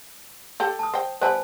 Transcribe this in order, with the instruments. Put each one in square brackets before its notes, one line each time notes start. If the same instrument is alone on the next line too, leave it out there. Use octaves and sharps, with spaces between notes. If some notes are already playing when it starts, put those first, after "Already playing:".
[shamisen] G4 A4 G5
[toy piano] A5 D#6
[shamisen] C5 G5
[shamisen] G3 B3 E4 [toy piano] C5 G#5 A5